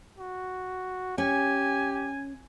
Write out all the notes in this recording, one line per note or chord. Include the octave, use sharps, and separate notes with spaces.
F#4
C#4 G4 G#5